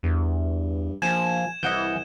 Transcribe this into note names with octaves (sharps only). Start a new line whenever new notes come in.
E2 G2
A#1 F3 G#5 G#6 E7
C2 E3 D#5 F#5 G6